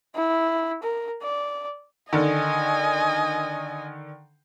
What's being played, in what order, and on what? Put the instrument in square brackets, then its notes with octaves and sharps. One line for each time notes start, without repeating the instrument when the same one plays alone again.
[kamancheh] E4
A#4
D5
[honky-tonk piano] D3 D#3 [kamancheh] D#5 G#5